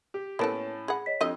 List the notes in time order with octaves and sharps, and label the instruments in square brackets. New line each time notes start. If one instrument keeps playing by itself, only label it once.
[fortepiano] G4
[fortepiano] A2 C#4 A5 [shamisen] A#3 B3 A4 [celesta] E4 D7
[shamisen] G#4 F#5 [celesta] B5
[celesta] C#5 D#5 B6
[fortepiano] F2 [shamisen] D3 G4 D#5 [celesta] F4 E6 D#7